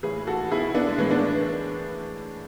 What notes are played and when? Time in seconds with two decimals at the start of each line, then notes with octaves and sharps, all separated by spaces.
0.03 A2 E3 G#4 B4
0.27 F#4 A4
0.51 B2 E4 G#4
0.74 B3 D4
0.87 G#3
0.98 A2 E3 G#3 B3
1.10 B3 D4